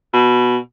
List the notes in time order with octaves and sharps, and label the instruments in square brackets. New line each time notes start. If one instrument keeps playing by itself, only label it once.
[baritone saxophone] B2